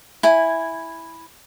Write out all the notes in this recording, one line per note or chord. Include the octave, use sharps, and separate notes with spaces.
E4 G#5